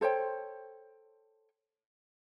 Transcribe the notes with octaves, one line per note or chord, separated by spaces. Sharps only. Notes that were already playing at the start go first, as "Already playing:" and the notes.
A4 C5 C#5 G5